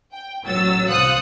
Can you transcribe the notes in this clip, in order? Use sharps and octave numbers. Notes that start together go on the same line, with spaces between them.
G5
A1 F#3 E6 A6
C2 C5 F5 D#6 F#6 C#7